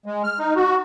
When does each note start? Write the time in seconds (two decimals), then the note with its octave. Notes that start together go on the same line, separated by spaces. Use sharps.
0.06 G#3
0.24 F6
0.39 D#4
0.56 F#4